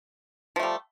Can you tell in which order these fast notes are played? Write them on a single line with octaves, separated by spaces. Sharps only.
F3 A3 G3